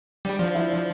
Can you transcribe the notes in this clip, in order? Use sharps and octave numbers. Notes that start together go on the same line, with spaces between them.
G3 D4
F3 D4
E4
D4